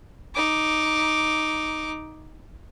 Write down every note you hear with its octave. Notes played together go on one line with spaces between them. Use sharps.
D#4 D6